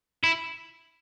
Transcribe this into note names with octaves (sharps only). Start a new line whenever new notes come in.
E4